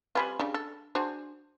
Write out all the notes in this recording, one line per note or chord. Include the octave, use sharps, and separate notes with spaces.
G3 C4 F4 B4 G#5 B5
C#3 G3 D4
A4
D4 F#4 G#4 C5